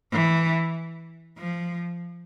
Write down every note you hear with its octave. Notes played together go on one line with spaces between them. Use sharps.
E3
F3